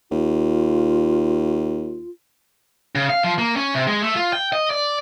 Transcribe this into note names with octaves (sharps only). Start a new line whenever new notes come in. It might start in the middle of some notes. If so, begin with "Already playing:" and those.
D#2 F4
C#3
F5
F3
A#3
C#4
C3
G#3
A3
F4
G5
D#5
D5